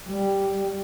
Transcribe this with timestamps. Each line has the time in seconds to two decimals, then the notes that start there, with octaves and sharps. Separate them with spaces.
0.08 G3